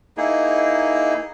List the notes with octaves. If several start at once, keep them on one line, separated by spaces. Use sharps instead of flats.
A#3 D#4 E4 G#4